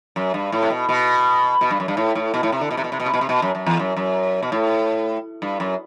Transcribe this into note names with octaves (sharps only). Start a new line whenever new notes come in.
F#2
G2
A2
C3
B2
B2
B2
G2
F#2
G2
A2
A2
B2
A2
C3
D3
B2
C3
B2
C3
B2
C3
B2
C3
B2
F#2
F#2
E2
F#2
F#2
B2
A2
G2
F#2